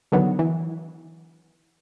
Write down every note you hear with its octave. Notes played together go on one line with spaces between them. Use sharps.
D3 D#3 F#3 B3
E3